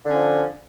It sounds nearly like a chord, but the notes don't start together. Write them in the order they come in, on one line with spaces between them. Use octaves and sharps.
D3 C#4 F3